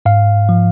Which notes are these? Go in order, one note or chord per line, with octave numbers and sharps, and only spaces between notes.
G#2 F5
F3